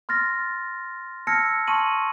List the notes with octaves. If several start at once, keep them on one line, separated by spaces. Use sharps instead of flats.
C6 F6 A6 A#6
A5 E6 F6 G#6 A#6 C#7
A5 C6 C#6 F6 D#7 F#7